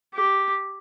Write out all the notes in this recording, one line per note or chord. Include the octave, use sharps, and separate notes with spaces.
G4